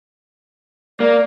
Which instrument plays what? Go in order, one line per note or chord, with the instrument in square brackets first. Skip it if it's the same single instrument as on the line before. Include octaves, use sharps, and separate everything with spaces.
[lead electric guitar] A#3 [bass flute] D5